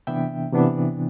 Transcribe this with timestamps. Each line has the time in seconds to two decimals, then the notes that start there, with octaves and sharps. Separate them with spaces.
0.07 C3 E3 B3 D4 E5 G5
0.52 C3 E3 B3 D4